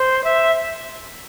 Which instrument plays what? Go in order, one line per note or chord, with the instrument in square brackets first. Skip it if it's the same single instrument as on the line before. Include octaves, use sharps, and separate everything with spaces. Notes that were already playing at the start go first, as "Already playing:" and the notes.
Already playing: [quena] C5
E5